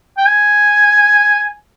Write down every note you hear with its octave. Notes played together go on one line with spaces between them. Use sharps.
G5
G#5